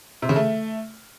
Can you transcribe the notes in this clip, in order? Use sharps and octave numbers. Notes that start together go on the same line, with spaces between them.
C3
C#3
A3